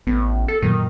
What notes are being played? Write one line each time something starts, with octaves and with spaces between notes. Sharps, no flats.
A1 B3
A4
F#2 A#2 D#3 F#3